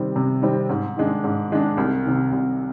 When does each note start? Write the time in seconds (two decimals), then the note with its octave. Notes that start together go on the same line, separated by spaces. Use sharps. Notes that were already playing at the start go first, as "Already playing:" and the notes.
Already playing: C3 D#3 G3 C4
0.16 C3
0.42 D#3 G3 C4
0.69 G#2
0.97 D#3 G#3 D4
1.24 G#2
1.51 D#3 G#3 D4
1.77 C2
2.05 C3 D#3
2.32 C2